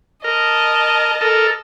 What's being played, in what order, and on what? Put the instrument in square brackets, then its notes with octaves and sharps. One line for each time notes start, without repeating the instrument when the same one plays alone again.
[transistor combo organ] A#4 [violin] D#5 A5
[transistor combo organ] A4 A#4